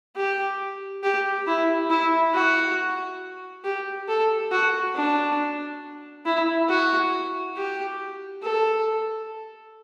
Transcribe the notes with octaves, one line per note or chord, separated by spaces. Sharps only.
G4
G4
E4
E4
F#4
G4
A4
F#4
D4
E4
F#4
G4
A4